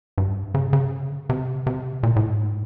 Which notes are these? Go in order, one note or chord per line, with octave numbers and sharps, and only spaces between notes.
G2
C#3
C#3
C3
C3
A#2
A2
G#2